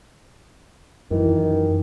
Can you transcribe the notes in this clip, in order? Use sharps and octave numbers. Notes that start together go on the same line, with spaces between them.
F#2 D#3 E3